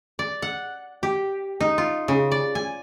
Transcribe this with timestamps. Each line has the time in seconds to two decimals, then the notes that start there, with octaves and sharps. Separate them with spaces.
0.19 D5
0.42 F#5
1.03 G4
1.60 D#4
1.78 F4
2.08 C#3
2.31 D5
2.55 G#5